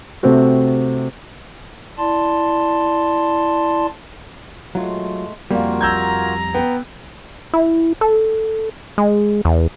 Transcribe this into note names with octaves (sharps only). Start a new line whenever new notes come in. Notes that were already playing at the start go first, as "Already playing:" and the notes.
C3 A3 C4 F#4
E4 D5 A5 C6
F#3 G#3 A3 F4
F2 G3 A#3 F4 F#4 A#4
A#5 E6 G6 G#6
B3 G5
E4
A4
G#3
E2